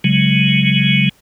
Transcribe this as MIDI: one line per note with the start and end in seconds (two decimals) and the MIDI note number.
0.04 1.09 49
0.04 1.09 54
0.04 1.09 56